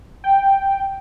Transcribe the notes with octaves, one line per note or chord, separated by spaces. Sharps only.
G5